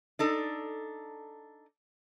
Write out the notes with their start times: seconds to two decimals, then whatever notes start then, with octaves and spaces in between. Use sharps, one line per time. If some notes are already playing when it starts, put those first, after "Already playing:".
0.19 D4 D#4 A4